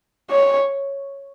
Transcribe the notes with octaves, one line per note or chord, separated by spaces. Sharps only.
C#5